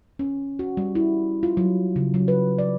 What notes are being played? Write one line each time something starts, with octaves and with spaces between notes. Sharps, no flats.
C#4
F#4
G3
E4
F4
F#3
C#3
F#3
B4
D5